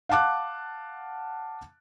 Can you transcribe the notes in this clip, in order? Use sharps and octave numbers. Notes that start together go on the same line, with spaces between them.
F5 F#5 A5 D6 F#6